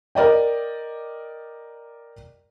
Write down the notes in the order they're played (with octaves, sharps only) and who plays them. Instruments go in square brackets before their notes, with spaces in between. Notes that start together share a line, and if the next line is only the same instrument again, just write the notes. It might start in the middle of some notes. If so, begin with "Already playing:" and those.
[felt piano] A#4 D5 D#5 G5